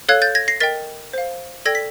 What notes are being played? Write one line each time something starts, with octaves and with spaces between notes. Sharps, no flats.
A4 C#5 F5 F#6 G#6
G6 A6
G#6 A#6
A#6 C7
A#4 D#5 G5 A6 B6
C5 F5
A4 D5 G5 G#6 A#6
B6